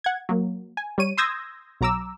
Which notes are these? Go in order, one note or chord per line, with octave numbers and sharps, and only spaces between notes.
F#5 G#6
F#3 A#3
G#5
G3 C#5 D#7
C6 D#6 E6 G6 G#6 A#6
B1 F#3 A#5 D6 E6